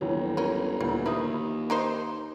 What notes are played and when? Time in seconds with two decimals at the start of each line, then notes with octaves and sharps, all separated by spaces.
0.01 G1 D#2 E3 F#3
0.37 C#4 A#4
0.81 D2 A#2 E3 A#3
1.06 D#2 F3 A#3 B4 E5 D#6
1.70 A#3 D#4 C5